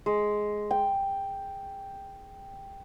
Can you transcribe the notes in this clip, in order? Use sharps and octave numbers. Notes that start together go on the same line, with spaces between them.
G#3
G5